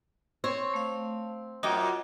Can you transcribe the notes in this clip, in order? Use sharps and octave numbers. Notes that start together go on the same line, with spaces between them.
C4 C5 C#5 C#6
A3 F5
F#2 F4 F#4 D#5 G5 D6